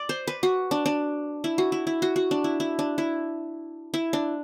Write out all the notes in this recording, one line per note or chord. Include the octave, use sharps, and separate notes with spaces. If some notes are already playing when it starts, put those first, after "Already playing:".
Already playing: D5
C5
B4
F#4
D4
D4
E4
F#4
E4
E4
F#4
F#4
D4
E4
E4
D4
E4
E4
D4